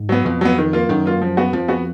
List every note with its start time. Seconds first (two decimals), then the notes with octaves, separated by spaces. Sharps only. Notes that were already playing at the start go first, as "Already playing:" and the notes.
Already playing: G#2
0.09 F#3 B3
0.25 F2 B2
0.41 F#3 B3
0.58 D#3
0.73 A#3 F4
0.89 F#2 D#3
1.06 A#3 F4
1.22 F3
1.37 B3 F#4
1.53 F2 F3
1.68 B3 F#4